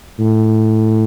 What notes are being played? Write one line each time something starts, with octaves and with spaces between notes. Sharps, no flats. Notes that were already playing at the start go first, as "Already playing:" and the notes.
A2